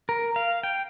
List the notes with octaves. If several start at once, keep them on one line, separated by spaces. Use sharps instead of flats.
A#4
F5
G5